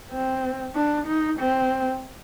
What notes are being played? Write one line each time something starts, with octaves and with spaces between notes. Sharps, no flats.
C4
D4
D#4
C4